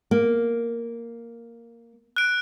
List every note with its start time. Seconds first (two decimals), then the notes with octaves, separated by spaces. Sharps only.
0.11 A#3
2.16 F#6 D7